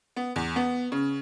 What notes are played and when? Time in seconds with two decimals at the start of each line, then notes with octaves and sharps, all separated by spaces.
0.16 B3
0.36 E2
0.56 B3
0.92 C#3